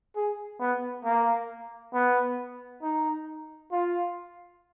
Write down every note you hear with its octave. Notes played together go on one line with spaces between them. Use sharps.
G#4
B3
A#3
B3
D#4
F4